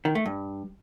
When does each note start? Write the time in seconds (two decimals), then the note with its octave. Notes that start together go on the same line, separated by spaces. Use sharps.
0.05 D#3
0.15 A3
0.26 G2